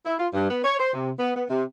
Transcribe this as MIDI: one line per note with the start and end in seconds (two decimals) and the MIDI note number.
0.05 0.14 64
0.19 0.27 65
0.33 0.50 43
0.50 0.60 59
0.64 0.76 73
0.79 0.93 72
0.93 1.10 48
1.19 1.32 59
1.35 1.44 59
1.49 1.63 48